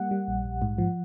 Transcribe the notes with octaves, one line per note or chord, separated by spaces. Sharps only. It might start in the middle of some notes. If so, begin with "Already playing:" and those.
Already playing: G3 A#3 F#5
G3
A#1
A#1
G#2
F3